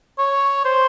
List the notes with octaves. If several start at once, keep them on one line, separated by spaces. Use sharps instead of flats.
C#5
C5